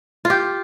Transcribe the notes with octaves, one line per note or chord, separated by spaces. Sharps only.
F4
G4 G6